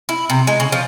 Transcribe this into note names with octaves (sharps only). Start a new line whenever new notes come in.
E4
C3
G#3
C#3
F3